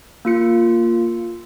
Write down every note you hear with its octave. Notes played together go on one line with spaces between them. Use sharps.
A#3 F4 C#7